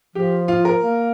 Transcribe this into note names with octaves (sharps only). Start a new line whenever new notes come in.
F3 G4
F4
A#4
A#3